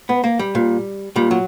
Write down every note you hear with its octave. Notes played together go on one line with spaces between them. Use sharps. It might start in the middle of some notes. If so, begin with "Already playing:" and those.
B3
A#3
G3
A#2
A#2 G3
F#3